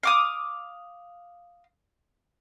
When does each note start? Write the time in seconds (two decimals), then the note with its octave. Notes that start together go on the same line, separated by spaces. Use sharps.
0.03 F5 D6 D#6